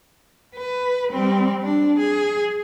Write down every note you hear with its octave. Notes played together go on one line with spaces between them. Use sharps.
B4
G3 C4
D4
G#4